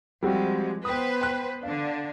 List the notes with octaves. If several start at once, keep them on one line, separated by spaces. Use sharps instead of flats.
F3 G3 G#3 C4 F#4
B3 B4 C5 G5 D#6
G5 F#6
D3 D4 F5